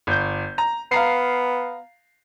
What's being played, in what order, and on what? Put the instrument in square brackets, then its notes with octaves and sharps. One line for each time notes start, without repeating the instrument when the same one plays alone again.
[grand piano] G1 G6
A#5
[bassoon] B3 [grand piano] F5 A#5 C7